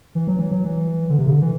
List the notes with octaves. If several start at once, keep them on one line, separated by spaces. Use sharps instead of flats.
E3
F#3
E3
F#3
E3
D3
C3
D3
E3